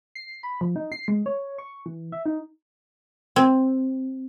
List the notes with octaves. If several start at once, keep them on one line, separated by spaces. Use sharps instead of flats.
C7
B5
F3
D#4
C7
G#3
C#5
C#6
E3
E5
D#4
C4